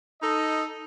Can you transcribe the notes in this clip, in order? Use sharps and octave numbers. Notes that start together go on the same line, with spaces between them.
D#4 A4 D#5